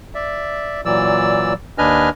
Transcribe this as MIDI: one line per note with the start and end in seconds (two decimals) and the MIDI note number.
0.15 0.81 74
0.15 0.81 76
0.85 1.53 46
0.85 1.53 52
0.85 1.53 54
0.85 1.53 74
0.85 1.53 88
1.78 2.09 39
1.78 2.09 62
1.78 2.09 71
1.78 2.09 75
1.78 2.09 80
1.78 2.09 89